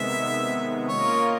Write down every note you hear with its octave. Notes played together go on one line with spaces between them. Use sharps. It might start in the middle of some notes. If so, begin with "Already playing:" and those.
Already playing: C3 D#3 G#3 B3 E5
A#3 C#4 F4 A#4 C#5 D#5